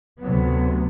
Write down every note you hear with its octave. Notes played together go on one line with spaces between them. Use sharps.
D2 C3 F#3 B3